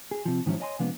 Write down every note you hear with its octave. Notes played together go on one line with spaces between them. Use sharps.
G#4
C3 F3
G#2 D#3 F3 F#3 C#4 E4
C#5 D#5 G#5 A#5 C6
C3 F3 G#3 A#3 B3 D4